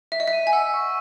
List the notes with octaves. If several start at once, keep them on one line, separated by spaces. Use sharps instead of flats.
E5 B6
D#5
E5
D#7
G#5
F#5 E6
C#6